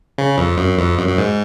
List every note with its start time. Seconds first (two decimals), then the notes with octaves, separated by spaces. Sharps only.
0.18 C#3
0.38 F2
0.58 F#2
0.78 F2
0.98 F#2
1.08 F#2
1.18 G#2